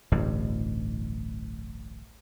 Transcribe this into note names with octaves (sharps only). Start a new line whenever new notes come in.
D1 A1 G2